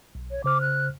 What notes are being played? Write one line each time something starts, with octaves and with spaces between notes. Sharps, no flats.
B1
C#5
C#3 C5 D6 F6
F#6